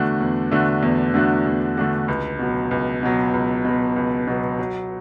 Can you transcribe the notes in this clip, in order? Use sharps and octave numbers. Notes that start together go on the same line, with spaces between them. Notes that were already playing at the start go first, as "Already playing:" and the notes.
Already playing: E2 D3 A3 D4 F#4
E2
D3 A3 D4 F#4
E2
D3 A3 D4 F#4
E2
D3 A3 D4 F#4
C#2
B2 F#3
C#2
B2 F#3
C#2
B2 F#3
C#2
B2 F#3
F#3